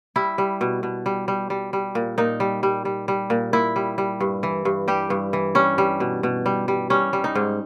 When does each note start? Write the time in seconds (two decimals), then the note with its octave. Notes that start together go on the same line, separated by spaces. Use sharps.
0.16 G3 E4
0.38 G3
0.61 B2
0.83 B2
1.06 G3
1.28 G3
1.50 G3
1.73 G3
1.95 A#2
2.18 A#2 D#4
2.40 G3
2.63 G3
2.85 G3
3.08 G3
3.30 A#2
3.53 A#2 E4
3.76 G3
3.98 G3
4.20 G2
4.43 E3
4.65 G2
4.88 G3 G4
5.10 G2
5.33 E3
5.55 G3 C#4
5.78 G3
6.00 B2
6.23 B2
6.46 G3
6.68 G3
6.90 G3 C#4
7.13 G3
7.24 D#4
7.35 G#2